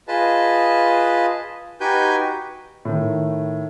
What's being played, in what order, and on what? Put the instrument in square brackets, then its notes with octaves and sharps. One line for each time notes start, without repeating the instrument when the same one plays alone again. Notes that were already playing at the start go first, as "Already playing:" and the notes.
[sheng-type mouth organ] F4 G#4 B4 D#5 A5
D#4 F#4 G4 B4 G#5 G6
[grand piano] A2 D#3